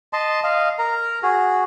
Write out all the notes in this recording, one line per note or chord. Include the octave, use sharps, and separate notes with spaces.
D#5 A5 C6
D#5 F5
A#4 A#5
F#4 G#4